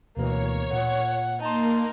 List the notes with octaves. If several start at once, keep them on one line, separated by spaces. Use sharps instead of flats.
D2 B2 E3 A#3 C#5
A#2 F#5
A#3 D#4 A5 C6